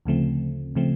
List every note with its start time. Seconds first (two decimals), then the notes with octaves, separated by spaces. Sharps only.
0.06 D2 C#3 F3 A3 C4
0.75 C#3 F3 A3 C4